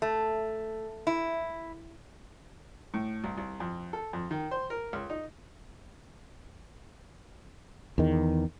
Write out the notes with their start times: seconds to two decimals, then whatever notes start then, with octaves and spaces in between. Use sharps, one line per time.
0.02 A3
1.07 E4
2.94 A2
3.24 C2
3.37 C2
3.60 F2
3.93 A4
4.13 F2
4.31 D#3
4.51 C5
4.70 A#4
4.93 C#2
5.10 D#4
7.98 E2 D#3